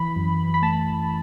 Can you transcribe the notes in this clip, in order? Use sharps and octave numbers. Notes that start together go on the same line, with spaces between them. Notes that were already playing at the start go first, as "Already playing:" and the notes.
Already playing: E3 B5
F#2
B5
A3 A5